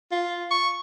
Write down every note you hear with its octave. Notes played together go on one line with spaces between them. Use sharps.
F4
C#6